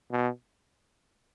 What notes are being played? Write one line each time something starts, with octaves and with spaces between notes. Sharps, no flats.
B2